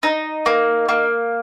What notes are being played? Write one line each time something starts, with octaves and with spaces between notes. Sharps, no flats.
D#4
A#3
A#3